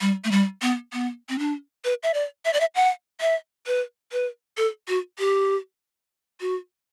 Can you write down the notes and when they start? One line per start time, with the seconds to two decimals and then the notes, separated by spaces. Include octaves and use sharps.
0.01 G3
0.24 A3
0.31 G3
0.62 B3
0.93 B3
1.29 C4
1.39 D4
1.85 B4
2.03 E5
2.14 D5
2.45 E5
2.53 D5
2.60 E5
2.75 F#5
3.21 E5
3.67 B4
4.12 B4
4.57 A4
4.88 F#4
5.19 G4
6.41 F#4